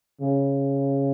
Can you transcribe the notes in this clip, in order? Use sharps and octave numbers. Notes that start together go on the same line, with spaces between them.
C#3